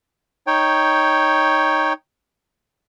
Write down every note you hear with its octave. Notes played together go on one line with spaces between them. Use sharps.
D#4 C#5 G5